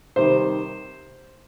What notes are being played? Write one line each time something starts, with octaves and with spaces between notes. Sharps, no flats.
C3 D#3 G3 C5